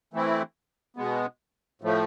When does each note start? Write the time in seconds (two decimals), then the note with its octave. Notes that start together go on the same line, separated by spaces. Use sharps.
0.14 E3 A3 C4 E4
0.96 B2 G#3 B3
1.82 A2 F3 A3